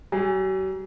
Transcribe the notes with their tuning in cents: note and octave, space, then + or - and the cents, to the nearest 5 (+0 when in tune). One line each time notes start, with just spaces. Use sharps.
F#3 +45 G#4 -20